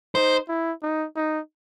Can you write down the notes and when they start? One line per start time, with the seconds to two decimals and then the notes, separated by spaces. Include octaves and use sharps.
0.15 D#4 C5
0.48 E4
0.82 D#4
1.16 D#4